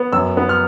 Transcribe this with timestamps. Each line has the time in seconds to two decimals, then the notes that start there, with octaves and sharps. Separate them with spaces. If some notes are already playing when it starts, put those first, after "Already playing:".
Already playing: B3
0.12 F#2 E6
0.37 B3
0.49 F6